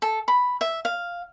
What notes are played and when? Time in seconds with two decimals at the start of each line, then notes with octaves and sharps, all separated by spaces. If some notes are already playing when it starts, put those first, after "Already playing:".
0.02 A4
0.28 B5
0.61 E5
0.85 F5